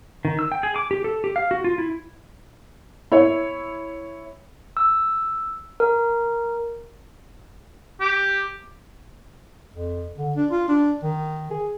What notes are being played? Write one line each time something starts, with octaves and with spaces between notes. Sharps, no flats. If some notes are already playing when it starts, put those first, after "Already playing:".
D#3
E6
G5
G#4
D6
G4
A4
G4
F5
F#4
F4
E4
E4 C#5
E6
A#4
G4
F2
D3
D4
F4
D4
D#3
G#4